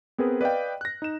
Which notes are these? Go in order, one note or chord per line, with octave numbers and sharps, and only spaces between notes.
B3 C4 G#4 A#4 B4
B4 D5 D#5 F5 G5
F#6 A#6
D#4 E7